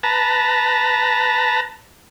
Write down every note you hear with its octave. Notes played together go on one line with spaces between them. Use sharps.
B4 A5 A#5